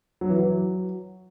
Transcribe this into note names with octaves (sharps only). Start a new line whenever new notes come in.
F#3
E3
F#3